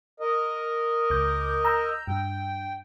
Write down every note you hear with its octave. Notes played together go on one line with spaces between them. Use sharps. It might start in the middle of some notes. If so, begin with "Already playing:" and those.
A#4 D#5
C#2 D6 G6
A#5 E6 G6
G2 G5